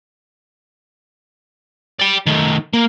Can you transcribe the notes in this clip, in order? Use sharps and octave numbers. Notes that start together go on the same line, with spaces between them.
D5 G5
D#3 A3
A#3